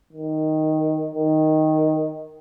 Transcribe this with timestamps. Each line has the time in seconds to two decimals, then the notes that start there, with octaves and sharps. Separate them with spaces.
0.13 D#3
1.15 D#3